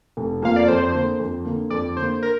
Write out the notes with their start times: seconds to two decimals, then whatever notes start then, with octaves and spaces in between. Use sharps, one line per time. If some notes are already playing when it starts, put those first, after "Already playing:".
0.17 F1
0.42 F2 F3 A#3 F5
0.56 D5
0.68 F2 C5
0.94 D3 A#3
1.19 F2
1.45 D3 A#3
1.70 F2 D5
1.96 D3 C5
2.01 A#3
2.23 A#4